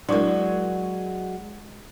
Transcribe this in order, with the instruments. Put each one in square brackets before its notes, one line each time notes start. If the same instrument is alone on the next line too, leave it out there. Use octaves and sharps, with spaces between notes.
[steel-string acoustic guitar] F#3 G#3 [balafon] D4 E4 A#4 [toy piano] D5 C#6